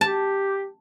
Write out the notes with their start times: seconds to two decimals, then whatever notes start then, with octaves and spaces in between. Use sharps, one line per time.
0.01 G4 A5